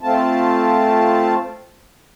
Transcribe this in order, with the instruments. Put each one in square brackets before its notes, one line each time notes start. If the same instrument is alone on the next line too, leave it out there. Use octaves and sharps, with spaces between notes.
[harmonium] A3 C4 F4 A5